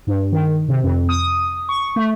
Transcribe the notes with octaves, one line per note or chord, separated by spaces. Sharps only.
G2
D#3
C3
F2
D#6
C#6
A3